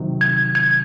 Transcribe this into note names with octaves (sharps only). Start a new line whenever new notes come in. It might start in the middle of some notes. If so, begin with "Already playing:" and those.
Already playing: C3 D#3 F#3
G#6
G#6